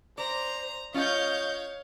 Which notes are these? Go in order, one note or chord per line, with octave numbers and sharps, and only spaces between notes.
C5 D5 A#5
C#4 F4 C#5 D#5 F5 G6